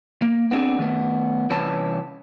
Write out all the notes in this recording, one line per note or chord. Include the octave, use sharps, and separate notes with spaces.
A#3
B3 C4 D4 G#4
D#3 A3 B3
C2 E3 C#4 B4 A5